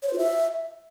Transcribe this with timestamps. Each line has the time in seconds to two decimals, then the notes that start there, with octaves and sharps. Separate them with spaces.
0.02 C#5
0.08 C5
0.13 F4
0.18 E5